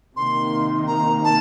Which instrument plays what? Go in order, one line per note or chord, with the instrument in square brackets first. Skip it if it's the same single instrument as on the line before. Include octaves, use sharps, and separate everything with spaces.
[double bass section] C3 D#3 A#3 [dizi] C6
[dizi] A#5
A5